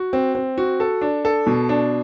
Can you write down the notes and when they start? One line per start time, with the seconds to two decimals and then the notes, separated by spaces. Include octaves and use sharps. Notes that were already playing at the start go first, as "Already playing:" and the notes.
Already playing: F#4
0.13 C4
0.35 C4
0.58 F#4
0.80 A4
1.01 D4
1.25 A4
1.47 B2
1.69 D4